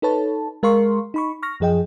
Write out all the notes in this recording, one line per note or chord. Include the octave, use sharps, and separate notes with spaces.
D#4 A4 B4 C#5 A5
G#3 A#4 F5 C6 C#6
D#4 B5 C#6
C#6 F6 A#6
F#2 F3 G#4 D#5 G5